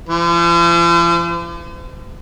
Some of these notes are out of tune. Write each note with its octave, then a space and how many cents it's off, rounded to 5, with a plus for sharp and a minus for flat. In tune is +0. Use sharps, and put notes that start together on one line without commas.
F3 -45 C5 -40